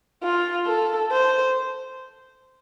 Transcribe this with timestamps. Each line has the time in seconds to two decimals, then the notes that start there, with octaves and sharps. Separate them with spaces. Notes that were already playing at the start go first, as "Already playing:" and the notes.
0.23 F4
0.66 A4
1.12 C5